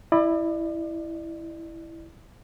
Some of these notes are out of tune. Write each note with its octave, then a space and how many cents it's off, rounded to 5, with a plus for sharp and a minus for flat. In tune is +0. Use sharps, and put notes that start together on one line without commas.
E4 +0 D5 +40